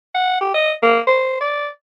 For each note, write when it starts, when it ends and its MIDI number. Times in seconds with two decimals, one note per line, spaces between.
0.15 0.39 78
0.41 0.51 67
0.54 0.72 75
0.82 0.99 58
1.07 1.37 72
1.40 1.67 74